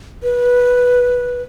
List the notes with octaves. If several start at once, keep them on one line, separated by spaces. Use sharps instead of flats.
B4